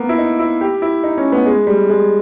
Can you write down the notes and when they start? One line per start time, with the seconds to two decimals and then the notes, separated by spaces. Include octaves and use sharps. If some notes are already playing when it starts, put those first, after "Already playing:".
Already playing: A#3 B3
0.09 E4
0.18 D#4
0.39 E4
0.61 G4
0.82 E4
1.03 D#4
1.18 C#4
1.32 B3
1.46 G#3
1.67 G3
1.89 G#3